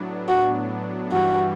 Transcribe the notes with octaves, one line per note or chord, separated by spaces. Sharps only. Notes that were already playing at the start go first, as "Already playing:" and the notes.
Already playing: A2 F#3 B3 D4
F#4
G2 E3 G3 F#4